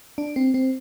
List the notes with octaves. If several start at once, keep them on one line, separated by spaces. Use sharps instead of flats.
D4
C4
C4